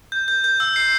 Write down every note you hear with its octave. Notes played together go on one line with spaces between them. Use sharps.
G6
G6
G6
E6
C7